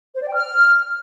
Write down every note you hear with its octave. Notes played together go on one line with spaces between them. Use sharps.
C5
D5
G5
F6